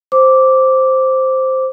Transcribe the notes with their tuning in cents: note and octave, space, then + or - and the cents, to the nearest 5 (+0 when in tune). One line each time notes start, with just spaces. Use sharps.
C5 +0 D6 -10